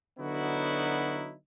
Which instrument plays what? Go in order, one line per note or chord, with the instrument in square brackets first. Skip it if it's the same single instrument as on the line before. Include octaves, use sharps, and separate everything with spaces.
[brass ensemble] D3 F#3 B3 D#4 E4 F#4